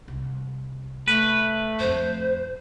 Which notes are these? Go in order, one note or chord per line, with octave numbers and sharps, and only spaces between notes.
C2
A3 B4
F2 A2 C5